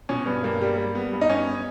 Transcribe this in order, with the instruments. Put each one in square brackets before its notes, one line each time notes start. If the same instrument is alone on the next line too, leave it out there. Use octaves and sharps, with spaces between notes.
[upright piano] B2 [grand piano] C#4
[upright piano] G2 [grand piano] B3
[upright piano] G2 [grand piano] A#3
[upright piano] G3
G3
B3
G2
[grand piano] D#4
[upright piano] B3 [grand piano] C#4